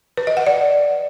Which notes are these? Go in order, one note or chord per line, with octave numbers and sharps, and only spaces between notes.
B4
D#5
F#5
D5